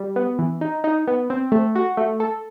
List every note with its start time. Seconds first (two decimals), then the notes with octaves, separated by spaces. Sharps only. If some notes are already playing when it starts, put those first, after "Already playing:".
Already playing: G3
0.16 B3
0.39 E3
0.61 D#4
0.84 D#4
1.07 B3
1.30 C4
1.52 A3
1.75 F#4
1.97 A3
2.20 A4